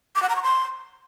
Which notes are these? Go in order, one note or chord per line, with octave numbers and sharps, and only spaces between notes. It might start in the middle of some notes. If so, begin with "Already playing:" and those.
D6
F#5
A#5
C#6
C6